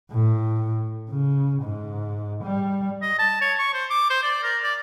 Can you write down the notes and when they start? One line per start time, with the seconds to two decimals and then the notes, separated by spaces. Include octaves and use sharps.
0.11 A2
1.10 C#3
1.62 G#2
2.44 G3
3.02 D#5
3.19 A5
3.41 C#5
3.59 C#6
3.74 C5
3.90 D6
4.10 C5
4.23 D5
4.43 A#4
4.64 D5